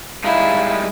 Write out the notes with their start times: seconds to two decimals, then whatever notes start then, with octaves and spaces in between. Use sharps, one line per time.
0.24 G3 G#3 D#4 E4 F5